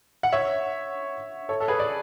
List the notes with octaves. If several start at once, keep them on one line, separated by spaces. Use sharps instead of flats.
F#5
C#5 E5
A4 C#5
A4
G#4 B4
D5